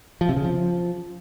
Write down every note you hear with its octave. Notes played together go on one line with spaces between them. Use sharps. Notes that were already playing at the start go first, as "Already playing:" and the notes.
F3
C3
C#3
F3